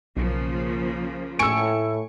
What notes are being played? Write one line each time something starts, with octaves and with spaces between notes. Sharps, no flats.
B1 C#3 F3 A#3
A2 G#5 C#6 E6 C#7 D7